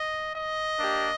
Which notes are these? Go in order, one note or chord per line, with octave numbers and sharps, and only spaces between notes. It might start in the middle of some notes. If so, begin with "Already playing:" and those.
Already playing: D#5
D#5
A#3 D4 G4